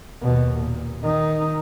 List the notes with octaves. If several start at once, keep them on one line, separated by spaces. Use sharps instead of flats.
D#2 B2
A#2
D#3 D#4